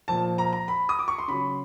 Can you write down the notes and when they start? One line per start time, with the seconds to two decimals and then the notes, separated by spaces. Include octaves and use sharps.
0.08 A#2 F3 A5
0.38 A#5
0.53 A#5
0.68 B5
0.89 D#6
0.99 D6
1.08 C#6
1.18 C6
1.28 C#3 F#3 B5